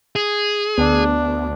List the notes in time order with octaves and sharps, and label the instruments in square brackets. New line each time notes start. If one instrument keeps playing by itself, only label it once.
[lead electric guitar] G#4
[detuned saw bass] D2 [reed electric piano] B3 [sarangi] D4